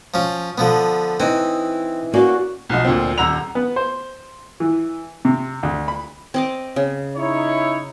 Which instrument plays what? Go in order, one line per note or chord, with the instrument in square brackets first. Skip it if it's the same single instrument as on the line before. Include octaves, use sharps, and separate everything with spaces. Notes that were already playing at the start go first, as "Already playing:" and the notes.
[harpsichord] F3 C#4
D3 F3 B3
[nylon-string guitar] E3 D#4 D#5 [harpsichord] C4
[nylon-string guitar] A#3 C#4 D5 [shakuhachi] F#4
[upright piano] B1 F3 F#4 D#5
D2 A#2 C4
D#1 F#5 A#5 E6 F7
[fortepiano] B3
C5
E3
C3
D2
B5
[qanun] C4 D#5 D6
C#3
[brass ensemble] D#4 E4 C#5